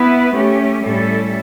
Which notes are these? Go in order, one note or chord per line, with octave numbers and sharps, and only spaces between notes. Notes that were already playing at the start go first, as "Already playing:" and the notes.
Already playing: B3 E4 B4
A3 C#4 G4
A2 G3 C#4 E4 A4